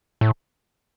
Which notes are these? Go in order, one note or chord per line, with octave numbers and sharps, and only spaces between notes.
A2